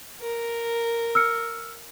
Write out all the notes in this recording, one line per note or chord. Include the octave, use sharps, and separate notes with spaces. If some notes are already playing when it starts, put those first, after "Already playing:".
A#4
E6 F6 C#7